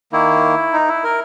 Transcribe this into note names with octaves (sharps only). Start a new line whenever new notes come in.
D#3 A#3 E4
D#4
E4
A#4